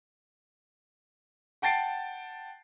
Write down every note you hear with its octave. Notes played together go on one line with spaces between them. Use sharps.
F#5 G5 A5 A6 C7 D7